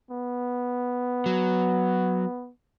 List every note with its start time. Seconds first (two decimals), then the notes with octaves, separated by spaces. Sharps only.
0.11 B3
1.26 F#3